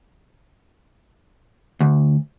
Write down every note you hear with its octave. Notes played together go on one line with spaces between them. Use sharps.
D2